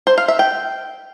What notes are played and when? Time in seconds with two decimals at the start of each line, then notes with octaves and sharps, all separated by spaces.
0.07 C5
0.18 F5
0.28 E5
0.39 G5